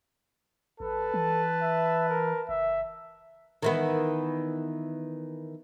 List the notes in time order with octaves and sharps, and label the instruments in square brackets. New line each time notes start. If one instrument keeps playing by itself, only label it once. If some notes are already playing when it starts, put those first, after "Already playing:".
[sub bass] A1 [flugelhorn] A4 [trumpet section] B4 A5
[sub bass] E3
[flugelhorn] E5
A#4
[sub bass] F#1 [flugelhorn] E5
[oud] D#3 E3 B3